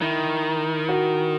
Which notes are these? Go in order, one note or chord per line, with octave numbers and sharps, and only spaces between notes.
D#3 E4
F#4